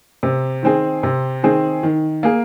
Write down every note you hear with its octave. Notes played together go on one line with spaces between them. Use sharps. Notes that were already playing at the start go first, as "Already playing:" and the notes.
C3
D#3 C4 G#4
C3
D#3 C4 G#4
D#3
A#3 G#4